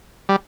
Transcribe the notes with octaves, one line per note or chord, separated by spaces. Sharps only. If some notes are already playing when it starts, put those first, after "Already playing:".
G3